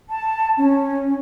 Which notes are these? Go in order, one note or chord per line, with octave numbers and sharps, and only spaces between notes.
A5
C#4